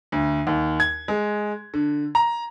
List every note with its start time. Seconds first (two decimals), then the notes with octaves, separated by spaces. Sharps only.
0.12 D2
0.47 D#2
0.80 G#6
1.08 G#3
1.74 D3
2.15 A#5